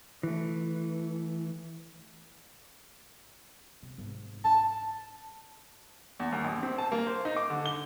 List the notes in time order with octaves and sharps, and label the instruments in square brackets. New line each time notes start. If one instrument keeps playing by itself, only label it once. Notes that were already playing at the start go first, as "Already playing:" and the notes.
[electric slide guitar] E3 A3
[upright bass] C3
G#1
[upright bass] D4 [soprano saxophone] A5
[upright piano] E2
D#2
A#1
C4
A5
A#3
C5
D#4
D6
D3
G7